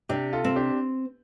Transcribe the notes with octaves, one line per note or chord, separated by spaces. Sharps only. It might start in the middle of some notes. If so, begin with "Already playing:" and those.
C3 D4 G4
F4 A4
C4
D4 G4